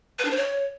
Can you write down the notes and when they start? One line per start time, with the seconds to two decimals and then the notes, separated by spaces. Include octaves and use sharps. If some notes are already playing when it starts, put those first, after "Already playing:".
0.19 B4
0.25 D4
0.31 C5
0.37 C#5